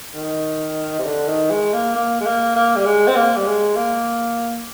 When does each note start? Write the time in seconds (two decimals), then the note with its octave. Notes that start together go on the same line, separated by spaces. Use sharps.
0.15 D#3
0.98 C3
1.05 D3
1.28 D#3
1.50 G#3
1.73 A#3
1.95 A#3
2.21 G#3
2.26 A#3
2.56 A#3
2.76 G3
2.85 G#3
3.08 C4
3.16 A#3
3.36 G3
3.46 G#3
3.76 A#3